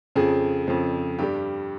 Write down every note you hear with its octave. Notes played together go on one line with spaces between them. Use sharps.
F2 C#3 F3 G#4
F2 C#3 F3
G2 G3 G4